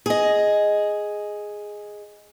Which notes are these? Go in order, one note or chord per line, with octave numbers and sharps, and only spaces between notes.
G#4 D#5